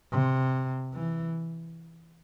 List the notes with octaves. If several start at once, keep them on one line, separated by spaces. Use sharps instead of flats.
C3
E3